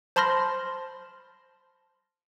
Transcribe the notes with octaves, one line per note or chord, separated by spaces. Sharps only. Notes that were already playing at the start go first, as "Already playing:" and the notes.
C5 A5 B5 C6 F6 A#6